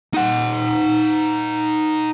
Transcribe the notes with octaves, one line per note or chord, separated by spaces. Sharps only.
D#4 F#5